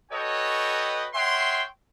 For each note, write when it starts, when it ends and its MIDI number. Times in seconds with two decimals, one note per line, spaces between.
0.11 1.07 66
0.11 1.07 69
0.11 1.07 71
0.11 1.07 73
0.11 1.07 75
0.11 1.07 79
1.14 1.63 73
1.14 1.63 76
1.14 1.63 78
1.14 1.63 79
1.14 1.63 84